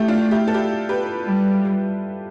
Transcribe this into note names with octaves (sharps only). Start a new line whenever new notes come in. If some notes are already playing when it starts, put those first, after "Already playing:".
Already playing: A3 E4 G4
D4 F4
E4 G4
A4
E4 G4
G4 B4
G3